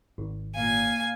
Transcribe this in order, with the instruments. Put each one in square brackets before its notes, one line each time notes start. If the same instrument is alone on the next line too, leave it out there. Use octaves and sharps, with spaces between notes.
[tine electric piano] G#1
[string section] A#2 [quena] F5 [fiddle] G#5